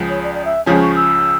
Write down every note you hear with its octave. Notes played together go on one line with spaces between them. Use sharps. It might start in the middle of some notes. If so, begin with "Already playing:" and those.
Already playing: C#2 C#3 F3
C#5
D5
D5
E5
C#2 C#3 F3 C#4
C#6
E6